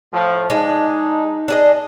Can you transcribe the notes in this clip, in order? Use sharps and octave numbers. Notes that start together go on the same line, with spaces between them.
A2 F3
G#3 D4 D#4
D4 G#4 D#5